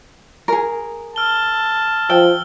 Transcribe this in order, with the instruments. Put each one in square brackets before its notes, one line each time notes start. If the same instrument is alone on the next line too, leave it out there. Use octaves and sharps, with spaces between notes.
[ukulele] G#4 A#4
[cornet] A5 [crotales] E6 F6 G7
[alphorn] F3 [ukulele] G5 [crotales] E6 G7